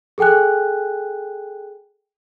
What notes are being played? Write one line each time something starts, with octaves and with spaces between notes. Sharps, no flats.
G#4 A4 G5 G#5 F#6